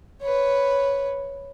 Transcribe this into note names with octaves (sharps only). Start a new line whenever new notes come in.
B4 C#5